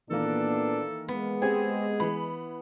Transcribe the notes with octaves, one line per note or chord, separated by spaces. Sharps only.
A#2 D#3 E3 A#3 B3 D4 A4
G#3 B3
C4 G4 G#4 G#5
E3 B3 B5